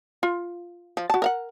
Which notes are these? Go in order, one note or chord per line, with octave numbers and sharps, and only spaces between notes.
F4
F3
F#4 A5
A#4 F5 F#5